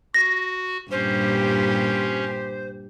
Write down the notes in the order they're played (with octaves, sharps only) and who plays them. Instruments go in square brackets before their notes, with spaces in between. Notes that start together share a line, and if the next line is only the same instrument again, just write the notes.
[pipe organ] F#4 [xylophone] A#6
[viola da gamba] G2 A#2 G4 [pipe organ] C#4 [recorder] C5